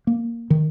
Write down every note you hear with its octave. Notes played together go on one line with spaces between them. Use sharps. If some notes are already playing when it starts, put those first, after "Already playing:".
A#3
D#3